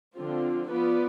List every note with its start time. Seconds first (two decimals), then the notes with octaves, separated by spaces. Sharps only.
0.15 D3 F3 C4 F4
0.68 F3 B3 F4 B4 D5